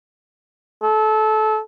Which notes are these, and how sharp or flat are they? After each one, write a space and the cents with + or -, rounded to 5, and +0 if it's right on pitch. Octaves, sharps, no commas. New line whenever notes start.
A4 -25